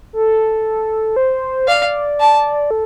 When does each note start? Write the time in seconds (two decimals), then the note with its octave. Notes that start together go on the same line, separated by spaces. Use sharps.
0.13 A4
1.16 C5
1.68 D5 F5
2.20 A5
2.71 A4